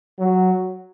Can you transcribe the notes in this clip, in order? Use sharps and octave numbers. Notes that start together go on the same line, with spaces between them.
F#3